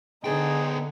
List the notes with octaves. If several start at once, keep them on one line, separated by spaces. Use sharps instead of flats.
D3 B3 D#4 G#4 G5